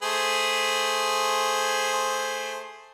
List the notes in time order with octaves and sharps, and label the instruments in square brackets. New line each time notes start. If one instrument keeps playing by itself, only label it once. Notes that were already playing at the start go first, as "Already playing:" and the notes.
[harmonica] A3 G#4 C5